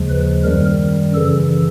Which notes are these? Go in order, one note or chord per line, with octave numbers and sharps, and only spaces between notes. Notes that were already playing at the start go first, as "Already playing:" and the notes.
Already playing: D#2 C#3 F3 G#3
B4
F#2 D#3 G3 A#4
F#2 C#3 E3 A4